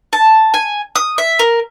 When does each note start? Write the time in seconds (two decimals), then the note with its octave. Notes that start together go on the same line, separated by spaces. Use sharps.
0.13 A5
0.54 G#5
0.96 D#6
1.18 E5
1.39 A#4